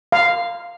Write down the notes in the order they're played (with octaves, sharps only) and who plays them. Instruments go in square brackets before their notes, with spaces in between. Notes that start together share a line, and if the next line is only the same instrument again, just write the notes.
[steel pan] F5